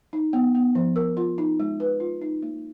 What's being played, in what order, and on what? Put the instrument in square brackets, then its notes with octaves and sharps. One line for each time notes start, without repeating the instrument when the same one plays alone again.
[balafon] D#4
B3
B3
F3
A#4
F4
D#4
G#3
B4
F4
D#4
A#3